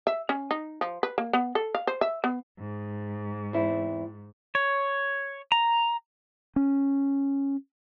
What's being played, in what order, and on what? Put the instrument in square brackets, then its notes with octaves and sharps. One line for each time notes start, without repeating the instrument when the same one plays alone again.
[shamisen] E5
C#4
D#4
F3
B4
A#3
B3
A4
F5
C5
E5
B3
[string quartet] G#2
[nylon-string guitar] E2 C4 E4
[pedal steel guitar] C#5
A#5
[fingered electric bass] C#4